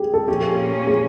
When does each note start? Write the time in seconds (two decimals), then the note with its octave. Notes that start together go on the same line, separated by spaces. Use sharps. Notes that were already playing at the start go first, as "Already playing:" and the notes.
Already playing: G4 G#4
0.14 A4
0.28 A#2 F3 A#3 C#4 G4
0.87 G#4